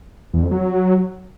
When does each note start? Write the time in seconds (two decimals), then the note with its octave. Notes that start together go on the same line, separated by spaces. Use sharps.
0.34 E2
0.42 F2
0.51 F#3